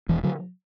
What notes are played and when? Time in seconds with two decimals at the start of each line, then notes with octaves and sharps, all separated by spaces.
0.09 E1 E3
0.23 D3 F#3